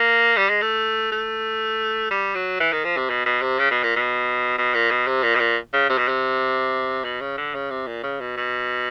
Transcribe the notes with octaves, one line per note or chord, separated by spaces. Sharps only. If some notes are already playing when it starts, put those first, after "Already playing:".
Already playing: A#3
G3
G#3
A3
A3
G3
F#3
E3
D#3
F3
C3
B2
B2
C3
C#3
B2
A#2
B2
B2
A#2
B2
C3
A#2
B2
A#2
C#3
C3
B2
C3
B2
C#3
D3
C#3
C3
A#2
C#3
B2
B2